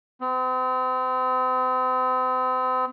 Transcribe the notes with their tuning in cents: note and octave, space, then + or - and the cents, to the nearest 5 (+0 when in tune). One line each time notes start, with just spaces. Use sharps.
C4 -40